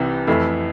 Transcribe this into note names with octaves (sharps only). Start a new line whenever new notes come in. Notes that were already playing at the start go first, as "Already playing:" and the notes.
Already playing: C2 C3 E3
F2 E3 A3 E4